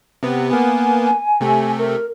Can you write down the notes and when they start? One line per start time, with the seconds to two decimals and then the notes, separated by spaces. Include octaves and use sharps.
0.23 C3 B3
0.51 A#3 B3 G#5
1.41 C3 A3
1.79 A#4